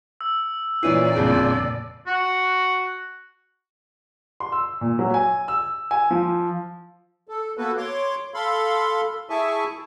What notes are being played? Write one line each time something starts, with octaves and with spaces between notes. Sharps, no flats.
E6
A#2 E3 C#4 E4 D5 C7 D#7
G1 F2 C#3
F#4
C6
E6
A#2
F#3
G#5
E6
G#5
F3
A4
A#3 B3 F#4 A4 B4
C#5 C6 D6
A4 F5 B5 C6
E4 G#4 E5 G#5 A5 C#6